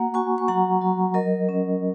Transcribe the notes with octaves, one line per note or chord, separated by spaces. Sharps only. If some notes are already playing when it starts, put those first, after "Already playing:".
Already playing: A#3 F#4 F#5 A#5
F#4 G#5 C#6
C#6
F#3 F#5 A#5
F#3
F#3 A#4 D#5
C#4